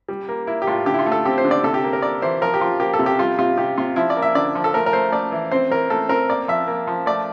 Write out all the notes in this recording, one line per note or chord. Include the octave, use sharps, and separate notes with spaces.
G3
A#3
A#3 E4
G4
A2 F4
D3 G4
E4
F4
A3
A4
C4 G4
C5
D3
D5
C3 A4
G4
A#3
A#4
A#3 D5
E3 C5
F3 A#4
G4
F3 F4
A#3 G4
A4
C3
G4
G3 F4
C3 F4
C3 G4
C3 F4
F3 E4
D5
A#3
E5
D3 D5
F3
A4
A3 A#4
A#4
A3 C5
A3 D5
E3
C4 C5
E3 A#4
A3 A4
C4 A#4
A#3 D5
F3 E5
A#3
F3
A3 D5